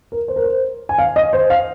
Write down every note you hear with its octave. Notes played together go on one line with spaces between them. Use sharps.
A#4
C5
A#4
C5
G#5
F5
D#5
C5
F5